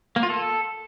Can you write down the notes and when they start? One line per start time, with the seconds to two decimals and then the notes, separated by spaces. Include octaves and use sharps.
0.16 A#3
0.23 F4
0.30 A4